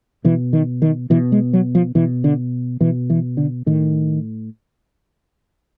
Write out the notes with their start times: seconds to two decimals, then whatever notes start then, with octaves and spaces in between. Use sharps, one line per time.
0.24 B2 E3
0.53 D#3
0.82 D#3
1.10 B2 E3
1.32 G#3
1.53 F#3
1.75 F3
1.95 B2 E3
2.24 D3
2.81 B2 E3
3.10 E3
3.37 D3
3.66 A2 D#3